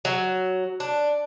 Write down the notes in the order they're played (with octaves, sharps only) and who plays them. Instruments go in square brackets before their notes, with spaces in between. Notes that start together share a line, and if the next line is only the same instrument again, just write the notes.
[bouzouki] F#3
D4